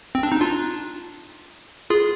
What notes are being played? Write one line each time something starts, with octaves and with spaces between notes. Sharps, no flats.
C4
D4
D#4
D4 F4
F4 G#4